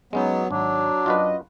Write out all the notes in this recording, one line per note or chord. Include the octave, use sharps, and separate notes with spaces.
F#3 G#3 B3 C#4 D#4
G#1 F#3 D4
F#2 F4 F#4 B4 D#5